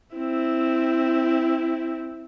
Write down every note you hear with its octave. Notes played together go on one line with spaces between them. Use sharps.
C4 E4